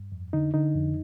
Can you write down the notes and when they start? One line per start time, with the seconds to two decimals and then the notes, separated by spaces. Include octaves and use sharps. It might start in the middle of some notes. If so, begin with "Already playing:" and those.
Already playing: G2
0.12 F2
0.33 D3 D#4
0.54 D3 D#4
0.75 F2